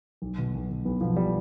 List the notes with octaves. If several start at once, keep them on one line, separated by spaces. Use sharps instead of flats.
B1
B2
B1
B2
B1 B3
B2 F3
G3